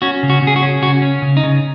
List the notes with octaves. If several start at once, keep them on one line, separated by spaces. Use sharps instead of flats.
C#4 F#4
C#3
F#4
C#3 G#4
F#4
C#4
C#3 F#4
C#4
C#3
D#4
C#3